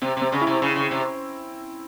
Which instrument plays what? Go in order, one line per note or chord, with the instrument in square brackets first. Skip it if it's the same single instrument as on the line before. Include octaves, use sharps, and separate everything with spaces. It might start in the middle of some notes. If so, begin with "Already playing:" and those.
[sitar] C3 [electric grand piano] C4
[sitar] C3 [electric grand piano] C4
[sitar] C#3
[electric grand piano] E4
[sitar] C3
[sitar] C#3 [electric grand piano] E4
[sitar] C#3
C3